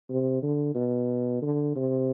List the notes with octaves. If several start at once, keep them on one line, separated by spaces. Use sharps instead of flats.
C3
D3
B2
D3
C3